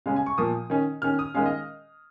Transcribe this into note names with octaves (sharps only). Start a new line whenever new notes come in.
C#3 G#3 C#4 F5
G#5
C#6
A#2 F3 A#3 D#6
D#3 C#4
D#3 C#4 F6
D#6
D#3 G#3 C#4 F5
D#5